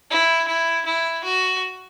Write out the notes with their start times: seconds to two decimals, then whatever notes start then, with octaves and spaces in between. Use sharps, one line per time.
0.11 E4
0.48 E4
0.86 E4
1.24 F#4